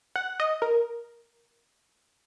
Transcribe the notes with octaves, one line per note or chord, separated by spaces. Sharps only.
F#5
D#5
A#4